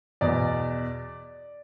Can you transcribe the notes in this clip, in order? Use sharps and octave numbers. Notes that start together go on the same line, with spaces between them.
E2 B2 D5